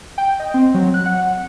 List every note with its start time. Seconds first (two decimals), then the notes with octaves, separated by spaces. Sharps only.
0.18 G5
0.40 D#5
0.54 C4
0.74 F#3
0.94 F#6
1.06 F#5